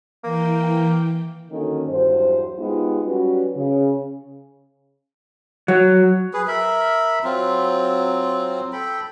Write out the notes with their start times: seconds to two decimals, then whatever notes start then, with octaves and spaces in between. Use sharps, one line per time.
0.24 E3 A#3 G5
1.50 D3 D#3 F#3 A#3 C#4 A4
1.88 E2 G2 F#3 C5
2.58 G#3 B3 D#4 F4 G4 G#4
3.05 F#3 G3 C#4 F#4 B4
3.56 C#3
5.68 F#3
6.33 G#4 B4
6.48 A#4 E5 B5
7.24 F#3 C4 F4
8.73 A4 G5 B5